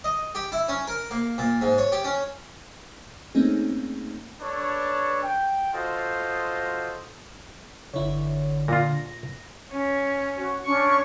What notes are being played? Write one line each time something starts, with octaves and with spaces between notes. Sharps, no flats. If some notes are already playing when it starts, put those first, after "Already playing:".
D#5
G4
E4
C#4
A#4
A#3
A#2
G#2
C#5
G4
C#4
A3 A#3 C4 C#4 D#4 G#4
D4 A4 B4 C#5
G5
F4 F#4 A4 C5 D#5
G1 D3 E4 C#5
A#2 F4 A#6
C#4
F#4
C#4 D4 C#6